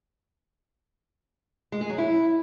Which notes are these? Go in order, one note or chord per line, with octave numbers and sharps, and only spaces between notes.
G#3
G#4
F#3
E4